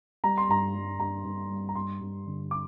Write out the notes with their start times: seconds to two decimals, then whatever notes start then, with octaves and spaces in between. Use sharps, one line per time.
0.24 G3 A#5
0.38 C6
0.49 G2 A#5
0.74 G3
0.99 G2 A#5
1.24 G2
1.50 G3
1.69 A#5
1.75 G2 C6
2.01 G2
2.26 D3
2.51 D6